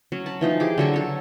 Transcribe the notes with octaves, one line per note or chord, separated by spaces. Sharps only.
F#3 C#4
A5 B5
E3 F3 D#4
G4 G#4 D6
D3 F#3 A4 C#6
F#3 A4 C#5